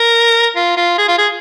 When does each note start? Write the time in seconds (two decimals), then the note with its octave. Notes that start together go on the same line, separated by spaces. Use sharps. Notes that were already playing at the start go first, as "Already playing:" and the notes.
Already playing: A#4
0.55 F4
0.77 F4
0.98 G#4
1.08 F4
1.18 G#4